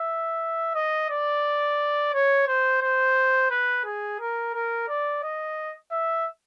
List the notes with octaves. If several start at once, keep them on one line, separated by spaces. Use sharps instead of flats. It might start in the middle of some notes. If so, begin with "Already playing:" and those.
Already playing: E5
D#5
D5
C#5
C5
C5
B4
G#4
A#4
A#4
D5
D#5
E5